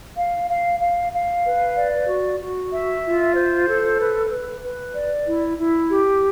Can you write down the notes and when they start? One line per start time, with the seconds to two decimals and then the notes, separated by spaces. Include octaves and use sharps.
0.17 F5
0.49 F5
0.81 F5
1.13 F5
1.45 B4
1.77 D5
2.08 F#4
2.40 F#4
2.72 E5
3.04 F4
3.36 C5
3.67 A4
3.99 B4
4.30 B4
4.62 B4
4.94 D5
5.25 E4
5.58 E4
5.90 G4